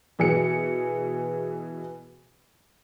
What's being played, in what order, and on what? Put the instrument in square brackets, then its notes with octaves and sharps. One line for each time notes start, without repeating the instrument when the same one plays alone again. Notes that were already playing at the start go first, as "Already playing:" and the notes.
[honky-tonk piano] B2 E3 G#4 C#7